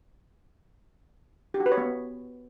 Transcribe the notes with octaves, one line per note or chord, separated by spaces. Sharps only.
G4
F#4
B4
C#5
B3